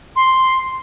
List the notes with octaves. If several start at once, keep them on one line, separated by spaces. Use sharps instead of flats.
C6